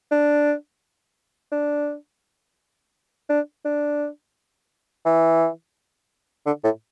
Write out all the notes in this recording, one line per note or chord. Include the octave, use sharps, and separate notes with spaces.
D4
D4
D4
D4
E3
D3
A2